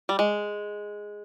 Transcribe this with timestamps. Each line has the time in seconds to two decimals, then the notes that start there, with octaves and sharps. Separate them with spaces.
0.09 G3
0.19 G#3